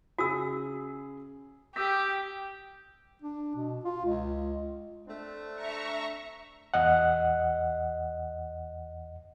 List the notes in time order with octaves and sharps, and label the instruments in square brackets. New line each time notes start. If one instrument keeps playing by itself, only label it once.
[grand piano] C#3 G#4 D#6 [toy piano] F#4 E6
[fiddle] G4 [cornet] G5 [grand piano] D#6 E6 B6
[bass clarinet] D4
B2
F4
C#2
[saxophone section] A3 C4 D4
[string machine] E5 A#5 C#6
[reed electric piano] E2 D#5 F#5